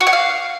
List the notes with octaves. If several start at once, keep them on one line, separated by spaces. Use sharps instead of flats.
F#4
F#5
F5